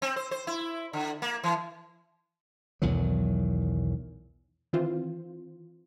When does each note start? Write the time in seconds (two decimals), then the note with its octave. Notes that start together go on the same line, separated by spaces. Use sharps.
0.02 C4
0.16 C5
0.31 C5
0.47 E4
0.93 D3
1.22 A#3
1.44 E3
2.82 B1 E2 D#3 F#3
4.73 D#3 E3 C4 F4 C5